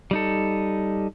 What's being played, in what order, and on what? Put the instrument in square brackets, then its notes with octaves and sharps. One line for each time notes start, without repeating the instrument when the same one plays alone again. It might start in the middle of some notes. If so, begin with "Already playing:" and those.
[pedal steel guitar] G3 D#4 A4